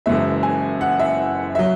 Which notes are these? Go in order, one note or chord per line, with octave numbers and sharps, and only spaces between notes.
F#1 F#2 E3 G#3 E5
G#5
F#5
E5
F#3 E5